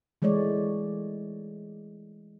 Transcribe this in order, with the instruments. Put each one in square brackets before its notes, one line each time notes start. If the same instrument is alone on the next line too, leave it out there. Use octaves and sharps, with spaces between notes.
[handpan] E3 G#3 A3 C#5 D5